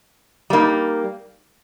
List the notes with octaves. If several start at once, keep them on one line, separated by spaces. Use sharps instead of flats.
G3 A#3 D#4